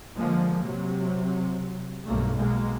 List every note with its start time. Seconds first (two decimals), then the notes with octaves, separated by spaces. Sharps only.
0.18 D3 F3 G#3 A#3
0.64 C3 F#3
2.06 B1 G2 A3 A#3
2.38 B2 G#3 A#3